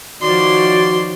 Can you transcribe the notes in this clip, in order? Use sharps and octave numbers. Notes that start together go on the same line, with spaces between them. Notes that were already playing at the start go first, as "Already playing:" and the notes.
D#3 F3 F#4 C#5 D5 C6